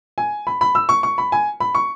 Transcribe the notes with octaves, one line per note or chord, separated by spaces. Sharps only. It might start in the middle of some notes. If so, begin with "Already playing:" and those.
G#5
B5
B5
E6
C#6
C#6
B5
G#5
B5
C#6